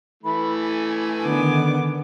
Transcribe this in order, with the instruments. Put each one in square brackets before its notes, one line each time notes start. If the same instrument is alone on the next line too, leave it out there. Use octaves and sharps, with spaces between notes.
[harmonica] E3 A3 [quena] B5
[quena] G#5
[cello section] D3 D#3 [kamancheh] B3 D6